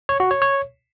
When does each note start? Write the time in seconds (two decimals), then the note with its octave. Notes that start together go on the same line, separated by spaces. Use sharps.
0.09 C#5
0.20 F#4
0.31 C#5
0.42 C#5